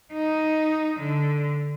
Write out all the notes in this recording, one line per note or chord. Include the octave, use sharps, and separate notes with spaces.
D#4
D3